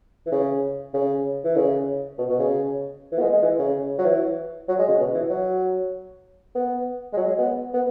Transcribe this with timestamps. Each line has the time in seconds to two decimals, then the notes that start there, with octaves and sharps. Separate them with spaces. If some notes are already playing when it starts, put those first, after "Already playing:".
0.26 E3
0.32 C#3
0.94 C#3
1.44 E3
1.57 C#3
2.19 B2
2.30 B2
2.39 C#3
3.12 E3
3.19 B3
3.22 G#3
3.33 G#3
3.43 E3
3.59 C#3
3.99 F#3
4.05 E3
4.69 F#3
4.79 G#3
4.89 C#3
5.00 B2
5.14 E3
5.30 F#3
6.55 B3
7.13 G#3
7.17 F#3
7.28 G#3
7.39 B3
7.74 B3